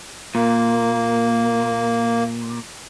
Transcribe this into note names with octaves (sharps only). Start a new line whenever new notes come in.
A#2 A#3